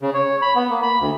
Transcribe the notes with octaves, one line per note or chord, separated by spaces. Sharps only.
C#3
C#5
B5
B3
A#3
B5
D2